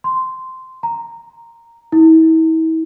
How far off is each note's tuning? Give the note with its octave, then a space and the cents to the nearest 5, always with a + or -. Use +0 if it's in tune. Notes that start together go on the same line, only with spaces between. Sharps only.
C6 -10
A#5 -10
E4 -40